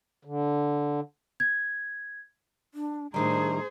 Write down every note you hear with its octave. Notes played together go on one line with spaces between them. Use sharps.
D3
G#6
D4
A2 D#3 G3 D4 G#4 C5 A#5